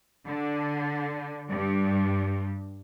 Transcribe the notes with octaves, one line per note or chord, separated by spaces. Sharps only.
D3
G2